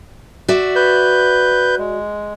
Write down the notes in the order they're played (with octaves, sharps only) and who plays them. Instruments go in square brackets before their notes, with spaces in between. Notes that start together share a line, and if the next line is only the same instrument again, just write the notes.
[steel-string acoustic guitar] F#4 D5 E5
[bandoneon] B4 G6
G#3